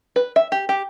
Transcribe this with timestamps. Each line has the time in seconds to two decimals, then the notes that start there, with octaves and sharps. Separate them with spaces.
0.16 B4
0.36 E5
0.52 G4
0.69 G4